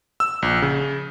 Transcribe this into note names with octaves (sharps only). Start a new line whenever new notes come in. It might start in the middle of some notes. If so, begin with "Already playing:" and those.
E6
A#1
C#3